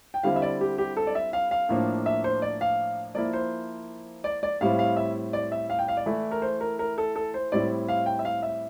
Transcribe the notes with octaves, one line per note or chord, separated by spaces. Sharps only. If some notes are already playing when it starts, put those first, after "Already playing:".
G5
D3 G3 C4 E4 F5
E5
D5
G4
G4
A4
D5
E5
F5
F5
A2 F3 A#3 D4
E5
C5
D5
F5
F3 A#3 E4 D5
C5
D5
D5
A2 G3 C4 E4 F5
F5
E5
D5
E5
F5
G5
F5
D5
E3 A3 E4
A#4
C5
A#4
A#4
A4
A4
C5
A2 G3 C4 E4 D5
F5
G5
E5
F5
E5